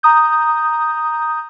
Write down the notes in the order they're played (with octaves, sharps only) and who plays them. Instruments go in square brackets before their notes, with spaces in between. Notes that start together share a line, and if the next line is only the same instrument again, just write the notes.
[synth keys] A#5 D#6 G6